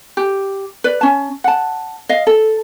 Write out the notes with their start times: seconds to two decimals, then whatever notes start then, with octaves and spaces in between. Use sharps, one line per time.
0.17 G4
0.84 B4 D5
1.01 C#4 A5
1.44 F#5 A5
2.09 D#5 F5
2.27 A4